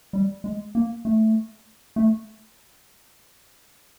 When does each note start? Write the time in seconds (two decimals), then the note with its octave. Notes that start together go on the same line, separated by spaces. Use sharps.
0.13 G3
0.44 G#3
0.75 A#3
1.05 A3
1.96 A3